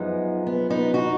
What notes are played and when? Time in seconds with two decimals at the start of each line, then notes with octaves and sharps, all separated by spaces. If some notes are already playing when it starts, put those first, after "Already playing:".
Already playing: F#2 F3 G#3 B3 D#4
0.47 B3
0.70 B3 D#4
0.94 D#4 F#4